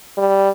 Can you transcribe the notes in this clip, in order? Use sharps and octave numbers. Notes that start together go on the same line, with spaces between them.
G3